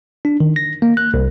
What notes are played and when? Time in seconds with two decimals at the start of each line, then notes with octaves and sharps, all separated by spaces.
0.25 D4
0.40 D#3
0.56 A#6
0.82 A#3
0.97 F#6
1.14 C2